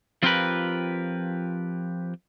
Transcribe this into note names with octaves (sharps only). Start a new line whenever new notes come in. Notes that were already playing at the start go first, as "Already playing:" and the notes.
F3 C4 F4 G4 A#4 B4